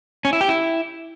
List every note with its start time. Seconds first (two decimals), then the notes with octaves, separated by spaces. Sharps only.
0.25 C#4
0.33 E4
0.41 G4
0.49 E4